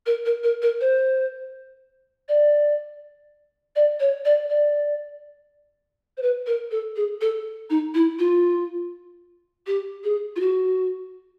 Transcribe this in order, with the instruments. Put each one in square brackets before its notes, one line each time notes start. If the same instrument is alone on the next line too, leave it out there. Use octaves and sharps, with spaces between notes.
[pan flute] A#4
A#4
A#4
A#4
C5
D5
D5
C#5
D5
D5
C5
B4
A#4
A4
G#4
A4
D#4
E4
F4
G4
G#4
F4
F#4